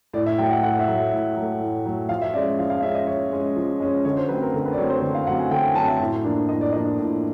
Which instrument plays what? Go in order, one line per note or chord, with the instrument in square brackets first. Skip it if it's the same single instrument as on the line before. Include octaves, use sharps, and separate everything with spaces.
[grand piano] A2 D5
E5
F#3 A3 G5
F#5
A2 F#5
E5
F#3 A3
E5
A2
F#3 A3
A2
F#3 A3
F3 F5
E5
G#3 C#4 D5
F3 F5
F5
G#3 C#4 E5
D#5
F3 C#5
G#3 C#4
F3
G#3 C#4
D3 C#5
C5
F#3 A3 C4 B4
A#4
D3
B4
D5
F#3 A3 C4 C#5
C5
D3
F5
F#3 A3 C4 F#5
G#5
D3 G5
G#5
F#3 A3 C4 A5
E5
A2
F3 A#3 D4
A2 D#5
D5
F3 A#3 D4 D#5
A2